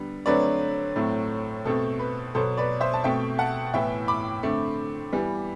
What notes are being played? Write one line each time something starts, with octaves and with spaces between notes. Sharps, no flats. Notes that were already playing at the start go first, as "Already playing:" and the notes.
Already playing: D3 G3 B3
D3 F#3 A3 C4 B4 D5
A2 F#3 A3 C4
B2 A3 C4 A4
B4
B2 F#3 B3 A4 C5
B4 D5
C5 E5
A5
B2 A3 C4 E5 G5
F#5 A5
A2 E3 B3 E5 G5
B5 D6
D3 A3 C4
E3 G3 B3